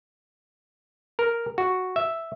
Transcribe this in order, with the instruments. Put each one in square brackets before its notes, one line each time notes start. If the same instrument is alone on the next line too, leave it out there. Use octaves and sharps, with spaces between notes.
[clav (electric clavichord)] A#4
F#4
E5